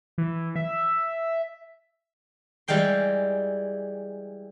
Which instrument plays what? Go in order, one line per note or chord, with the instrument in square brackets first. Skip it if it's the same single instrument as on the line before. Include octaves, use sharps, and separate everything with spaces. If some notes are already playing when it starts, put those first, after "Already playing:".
[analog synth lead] E3
E5
[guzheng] E3 G3 G#3 F5 G5 C6